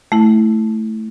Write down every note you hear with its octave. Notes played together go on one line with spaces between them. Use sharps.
A3 E4